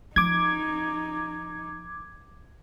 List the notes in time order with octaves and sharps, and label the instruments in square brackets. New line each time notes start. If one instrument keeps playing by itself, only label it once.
[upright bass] F3 [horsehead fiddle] D#4 [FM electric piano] D6 G#6